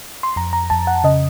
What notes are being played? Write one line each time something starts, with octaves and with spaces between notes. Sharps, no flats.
C6
F2 A#5
A#5
F2 A5
F#5
C#3 D#5